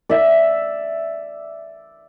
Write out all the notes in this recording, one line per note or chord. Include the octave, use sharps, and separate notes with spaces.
D5 E5